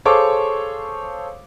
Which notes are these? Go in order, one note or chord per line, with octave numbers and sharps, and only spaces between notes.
G#4 A4 C5 C#5 F5 D6